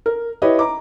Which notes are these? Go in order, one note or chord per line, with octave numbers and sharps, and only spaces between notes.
A#4
E4 G4 B4 C#5 D#5
A#5 D6